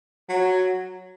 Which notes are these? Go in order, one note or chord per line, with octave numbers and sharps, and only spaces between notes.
F#3